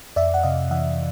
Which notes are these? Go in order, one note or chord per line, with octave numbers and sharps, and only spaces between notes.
F2 D5 E5
F#5
C3 D#5 F5
E3 E5 F#5